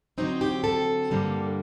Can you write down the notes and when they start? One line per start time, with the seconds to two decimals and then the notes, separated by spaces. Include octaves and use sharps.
0.18 D3 F#3 C4 D#4
0.41 G4
0.64 A4
1.10 G2 D3 G3 A#3 D4